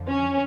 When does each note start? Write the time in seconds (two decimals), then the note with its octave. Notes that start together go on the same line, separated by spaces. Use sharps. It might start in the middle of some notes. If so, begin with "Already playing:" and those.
Already playing: F2 D3 F3
0.09 C#4